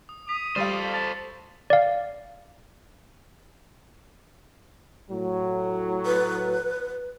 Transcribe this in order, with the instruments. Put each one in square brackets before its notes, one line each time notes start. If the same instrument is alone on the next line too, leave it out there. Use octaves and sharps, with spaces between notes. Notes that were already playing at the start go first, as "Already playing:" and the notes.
[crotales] D#6
[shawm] D#6 [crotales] B6 F7
[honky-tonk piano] G3 G4 F5 [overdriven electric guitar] A4 C5 [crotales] C#6 A6 D#7
[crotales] D6 D#6 A6
[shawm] A5
[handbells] D5 F5
[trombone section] A2 F#3
[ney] B4